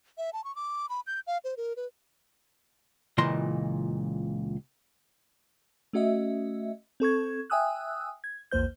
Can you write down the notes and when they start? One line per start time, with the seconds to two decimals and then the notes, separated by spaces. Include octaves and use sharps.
0.18 E5
0.33 A5
0.44 C#6
0.56 D6
0.90 B5
1.07 G6
1.27 F5
1.44 C5
1.57 A#4
1.77 B4
3.18 C#2 A#2 C#3 E3 D#5 C6
5.93 A3 C#4 F#4 D#5 E5
7.00 C4 A4 C#6 G#6
7.50 E5 G5 G#5 D#6 E6 F#6
8.24 G#6
8.51 A#1 E2 A#3 C5 G6